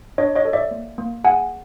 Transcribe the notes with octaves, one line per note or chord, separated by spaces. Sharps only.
D4 C#5 D#5
C#5 D#5
A4
D5 E5
A#3
A#3
G#4 F#5 G#5